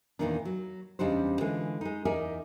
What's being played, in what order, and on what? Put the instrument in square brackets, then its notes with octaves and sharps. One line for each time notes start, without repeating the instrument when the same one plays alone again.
[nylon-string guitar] E2 G2 A#2 D#3 A#3 D4
F#3
E2 C#3 G3 D4 D#4 C5
D3 E3 G#3 F4
G#3 D#4
E2 D#4 A#4 D5 E5 G#5